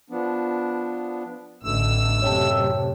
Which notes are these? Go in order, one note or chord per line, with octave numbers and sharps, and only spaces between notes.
F3 B3 D4
A1 B2 D3 A3 E6
F#2 A2 C3 C#5 G5 A5